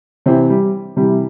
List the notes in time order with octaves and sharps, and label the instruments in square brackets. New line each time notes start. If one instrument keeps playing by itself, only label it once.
[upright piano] C3 E3 C4
G3
C3 E3 G3